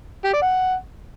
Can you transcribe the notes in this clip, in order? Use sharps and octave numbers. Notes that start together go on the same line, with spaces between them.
G4
D5
F#5